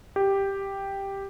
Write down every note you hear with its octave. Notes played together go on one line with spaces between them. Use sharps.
G4